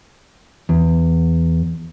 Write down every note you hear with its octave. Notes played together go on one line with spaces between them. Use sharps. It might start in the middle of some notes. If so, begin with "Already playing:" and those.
E2